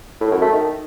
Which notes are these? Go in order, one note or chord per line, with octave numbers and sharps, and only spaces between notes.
A2
F#2
A3
D#3